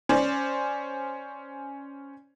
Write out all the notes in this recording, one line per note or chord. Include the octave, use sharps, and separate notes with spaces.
C#4 C5 D5